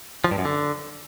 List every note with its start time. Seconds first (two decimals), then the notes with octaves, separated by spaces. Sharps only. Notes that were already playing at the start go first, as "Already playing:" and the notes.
0.24 F3
0.31 G2
0.38 F#2
0.45 D3